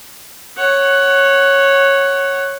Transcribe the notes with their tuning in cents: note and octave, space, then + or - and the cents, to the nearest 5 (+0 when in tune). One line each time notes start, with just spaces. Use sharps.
C#5 -10 F#5 +10